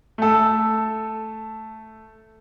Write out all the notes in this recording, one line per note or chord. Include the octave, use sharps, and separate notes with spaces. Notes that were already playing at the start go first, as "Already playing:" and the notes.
A3 A4